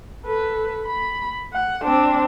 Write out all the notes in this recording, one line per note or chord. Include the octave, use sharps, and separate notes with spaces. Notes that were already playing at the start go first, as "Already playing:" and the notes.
A4 B4
B5
F#5
C4 D4